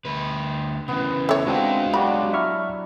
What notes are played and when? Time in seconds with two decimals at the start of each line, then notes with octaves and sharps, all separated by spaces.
0.05 D2 B4
0.88 C#3 E3 B3
1.29 A3 C#5
1.46 G#3 C4 D4 F4 F#4
1.94 F#3 D4 F#4 G4 G5 B5
2.33 F#3 E4 E5 A#5 C#6 F6